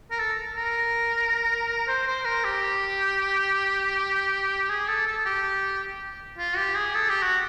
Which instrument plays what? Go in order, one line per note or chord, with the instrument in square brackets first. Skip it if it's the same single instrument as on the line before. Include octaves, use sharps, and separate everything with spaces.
[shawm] A#4
A4
A#4
C5
C5
A#4
G4
G#4
A4
A4
G4
F4
G4
G#4
A4
G4
F#4